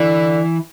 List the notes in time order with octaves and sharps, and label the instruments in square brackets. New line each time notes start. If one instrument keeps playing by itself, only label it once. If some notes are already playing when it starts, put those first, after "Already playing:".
Already playing: [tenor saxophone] D3 [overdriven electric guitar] E3